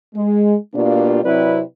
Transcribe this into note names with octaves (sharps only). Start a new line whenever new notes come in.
G#3
B2 A#3 D4 F4 G4 D5
C3 F#3 C4 E4 B4 D5